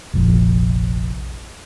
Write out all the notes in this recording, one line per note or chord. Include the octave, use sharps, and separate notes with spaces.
F1 A#1 F3